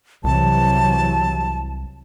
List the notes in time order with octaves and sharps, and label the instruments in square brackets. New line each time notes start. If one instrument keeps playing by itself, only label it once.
[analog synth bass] C2 [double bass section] C3 E3 F#3 [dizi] A5